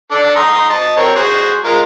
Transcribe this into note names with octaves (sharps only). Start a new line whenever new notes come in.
D4 A4 D5
A#5 C6 D#6
D#5 A5
C4 A#4 C#5
F#4 G#4 C5
G#3 F4 A#4